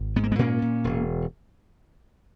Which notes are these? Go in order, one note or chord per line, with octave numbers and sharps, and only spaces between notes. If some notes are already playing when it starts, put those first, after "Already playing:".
Already playing: G#1
G#2 B3
A#3
G#3 B3
A#2 A#3 C#4
A#2
E1